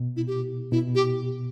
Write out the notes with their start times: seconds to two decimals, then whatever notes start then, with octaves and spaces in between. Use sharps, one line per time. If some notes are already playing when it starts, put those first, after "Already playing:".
Already playing: B2
0.16 E4
0.27 G4
0.72 B2 E4
0.95 G4